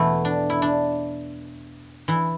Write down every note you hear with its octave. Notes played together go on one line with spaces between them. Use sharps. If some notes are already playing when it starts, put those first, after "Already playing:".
Already playing: E2 B2 E3 A3 E4
D4
E4
D4
E3 E4